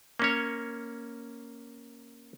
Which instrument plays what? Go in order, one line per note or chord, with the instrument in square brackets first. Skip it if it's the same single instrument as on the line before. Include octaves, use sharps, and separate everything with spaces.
[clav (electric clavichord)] A#3 C#4 C#5